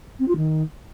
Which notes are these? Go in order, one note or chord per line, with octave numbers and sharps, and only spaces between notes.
C4
F4
D#3